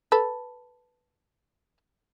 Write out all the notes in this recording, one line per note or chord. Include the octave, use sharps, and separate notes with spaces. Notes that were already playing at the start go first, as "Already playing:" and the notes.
A4 B4